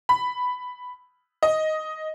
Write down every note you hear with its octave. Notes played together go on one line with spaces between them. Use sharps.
B5
D#5